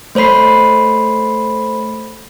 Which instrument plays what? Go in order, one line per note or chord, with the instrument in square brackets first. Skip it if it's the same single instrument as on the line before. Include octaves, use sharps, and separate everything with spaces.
[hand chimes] A3 C5 C#5 B5 C7